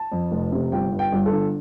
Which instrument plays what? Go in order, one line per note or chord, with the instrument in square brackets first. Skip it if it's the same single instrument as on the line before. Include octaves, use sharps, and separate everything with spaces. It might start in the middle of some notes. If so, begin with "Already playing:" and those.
Already playing: [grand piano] A5
F2
F1
C3
G1 G5
G2
G5
G1
A4
D3